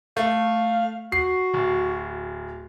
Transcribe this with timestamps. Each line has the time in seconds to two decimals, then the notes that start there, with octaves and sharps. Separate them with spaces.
0.17 A3 F5
1.12 F#4 C7
1.54 D1